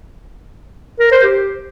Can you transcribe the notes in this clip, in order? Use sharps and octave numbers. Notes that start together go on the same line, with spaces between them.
A#4
C5
G4